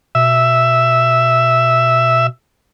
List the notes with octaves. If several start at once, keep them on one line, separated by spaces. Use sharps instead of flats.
B2 E5